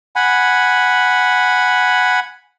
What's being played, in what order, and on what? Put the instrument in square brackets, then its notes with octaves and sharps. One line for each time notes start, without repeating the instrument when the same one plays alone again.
[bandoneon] F#5 G#5 B5